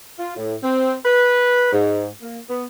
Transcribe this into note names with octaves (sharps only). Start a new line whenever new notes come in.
F4
A2
C4
B4
G#2
A#3
B3